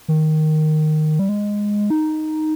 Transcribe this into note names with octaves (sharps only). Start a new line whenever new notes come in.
D#3
G3
G#3
D#4